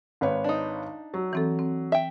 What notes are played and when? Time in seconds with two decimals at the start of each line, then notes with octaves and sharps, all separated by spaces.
0.21 G#1 B4 C#5
0.44 D4 D#4
1.14 F#3
1.33 E3 C4 A4
1.59 C4
1.92 E5 G5